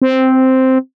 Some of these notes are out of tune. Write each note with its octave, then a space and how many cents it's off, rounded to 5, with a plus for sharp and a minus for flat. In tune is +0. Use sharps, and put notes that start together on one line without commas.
C4 -5